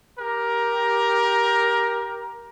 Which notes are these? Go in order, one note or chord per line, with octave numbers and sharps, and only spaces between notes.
G4 A#4